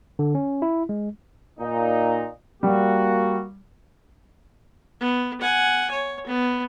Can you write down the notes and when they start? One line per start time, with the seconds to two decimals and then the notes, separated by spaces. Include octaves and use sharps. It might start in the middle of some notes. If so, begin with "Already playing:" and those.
0.19 D3
0.35 C#4
0.62 E4
0.89 G#3
1.60 A#2 D#4
2.63 G3 A#3 F#4
5.00 B3
5.41 F#5 G#5
5.90 C#5
6.26 B3